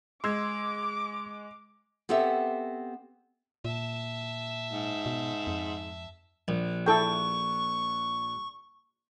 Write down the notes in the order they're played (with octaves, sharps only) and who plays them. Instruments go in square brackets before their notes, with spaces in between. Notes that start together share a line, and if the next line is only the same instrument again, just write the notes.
[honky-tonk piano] G#3 [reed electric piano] C6 E6 G#6 [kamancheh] D6
[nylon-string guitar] B3 C4 G4 A4 E5
[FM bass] A#2 [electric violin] E5 A5
[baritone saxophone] G#2
[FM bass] B2
F2
[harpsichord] A#1
[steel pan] E4 A4 G5 [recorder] C#6